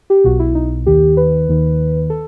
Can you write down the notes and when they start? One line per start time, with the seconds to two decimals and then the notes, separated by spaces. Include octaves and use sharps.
0.10 G4
0.24 B1 B2 F#4
0.39 E4
0.55 D#4
0.86 D#2 D#3 G4
1.17 B4
1.48 D#2 D#3
2.10 A4